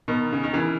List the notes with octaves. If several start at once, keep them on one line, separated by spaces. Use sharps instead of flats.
B2 D#3 A#4
C#3
D#3
C#3 E3